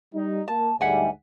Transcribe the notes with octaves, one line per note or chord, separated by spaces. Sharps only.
G3 D#4
A#3 A5
D2 G#2 G3 E5 F#5 G#5